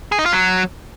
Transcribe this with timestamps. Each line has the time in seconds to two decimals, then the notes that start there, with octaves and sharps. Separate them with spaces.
0.12 G#4
0.19 D#4
0.26 F4
0.33 F#3